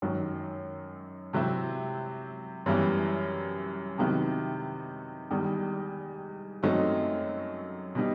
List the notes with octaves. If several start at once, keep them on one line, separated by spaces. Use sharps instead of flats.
F#2 D#3 F#3
C3 F#3 C4 E4
F#2 E3 G3 B3 E4
C3 D#3 F#3 B3 E4
E2 D#3 G3
F#2 F#3 A3 C4 D#4
B2 G3 D#4